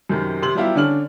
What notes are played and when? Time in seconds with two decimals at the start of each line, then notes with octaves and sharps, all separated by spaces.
0.09 F#2 C3 D#3
0.42 C3 C6 F#7
0.55 F#3 G3 B3 E4 F4 G4
0.75 D3 C#4 D4 F6 F#7